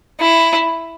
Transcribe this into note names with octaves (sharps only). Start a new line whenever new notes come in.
E4